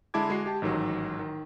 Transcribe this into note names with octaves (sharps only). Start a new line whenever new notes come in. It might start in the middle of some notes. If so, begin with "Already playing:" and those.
D3 G#3 E4 A5 D6 G#6
G#3 F#4 C7
G4 A5
A1 G#2 D#3 F#3
D#3